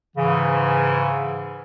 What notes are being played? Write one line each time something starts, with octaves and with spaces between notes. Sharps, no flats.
G#2 C#3 E3